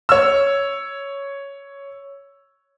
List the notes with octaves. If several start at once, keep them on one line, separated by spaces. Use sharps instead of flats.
C#5 E6